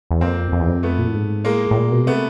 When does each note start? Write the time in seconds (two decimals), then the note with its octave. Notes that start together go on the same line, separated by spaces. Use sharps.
0.11 E2
0.21 F2 A#3 C4
0.52 F2
0.60 E2
0.68 F2
0.83 A3 B3
0.99 A#2
1.07 A2
1.14 G#2
1.45 A2 G#3 A#3
1.71 A2
1.76 A#2
1.91 B2
2.06 C3 A3 B3